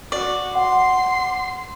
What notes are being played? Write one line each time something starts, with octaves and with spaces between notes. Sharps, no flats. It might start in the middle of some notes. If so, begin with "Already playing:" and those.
F#4 D5
F#5 C6 C7